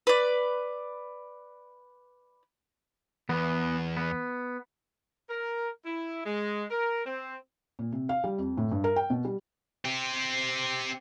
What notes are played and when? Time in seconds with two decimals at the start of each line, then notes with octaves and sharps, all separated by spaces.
0.07 B4 D5
3.29 E2 B3
3.97 B3
5.29 A#4
5.85 E4
6.26 G#3
6.71 A#4
7.06 C4
7.79 A#2
7.92 C3
8.09 F5
8.24 G3
8.38 F2
8.57 A2
8.71 G2
8.84 A#4
8.96 G5
9.10 B2
9.25 G3
9.85 C4 G4